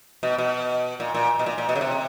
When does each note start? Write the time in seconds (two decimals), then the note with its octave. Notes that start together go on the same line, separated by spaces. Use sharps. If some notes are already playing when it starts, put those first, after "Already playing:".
0.23 B2
0.38 B2
1.00 A#2
1.15 A#2
1.39 B2
1.46 A#2
1.58 A#2
1.69 B2
1.75 C#3
1.81 C3